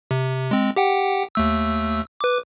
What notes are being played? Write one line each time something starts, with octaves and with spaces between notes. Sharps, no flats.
C3
G#3 C4
G4 F#5 G5
D#2 A3 E6
B4 D6